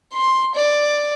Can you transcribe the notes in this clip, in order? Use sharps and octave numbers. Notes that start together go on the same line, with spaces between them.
C6
D5